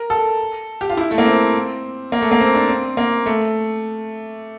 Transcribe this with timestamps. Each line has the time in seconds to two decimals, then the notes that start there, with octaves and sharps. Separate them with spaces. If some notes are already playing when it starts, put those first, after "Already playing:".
Already playing: A#4
0.10 A4
0.81 G4
0.90 F4
0.97 E4
1.11 A3
1.18 A#3
1.26 C4
2.12 A#3
2.21 A3
2.31 A#3
2.40 C4
2.55 D4
2.69 C4
2.97 A#3
3.26 A3